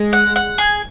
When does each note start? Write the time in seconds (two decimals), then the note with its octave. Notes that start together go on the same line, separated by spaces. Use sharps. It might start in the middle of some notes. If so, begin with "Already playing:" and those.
Already playing: G#3
0.13 F#5
0.36 F#5
0.58 G#4